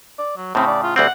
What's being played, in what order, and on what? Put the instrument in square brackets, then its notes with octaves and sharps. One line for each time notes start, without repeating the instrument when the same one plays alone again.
[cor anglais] D5
F#3
[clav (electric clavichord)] A2 C#3 [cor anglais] C4
[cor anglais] D5
F4
[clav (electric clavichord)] D2 G3 C4 [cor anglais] F#5